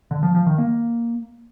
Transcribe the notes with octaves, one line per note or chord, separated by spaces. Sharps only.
D3
F3
F3
D#3
A#3